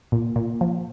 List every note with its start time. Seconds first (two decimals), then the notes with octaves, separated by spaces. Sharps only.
0.12 A#2
0.36 A#2
0.61 F3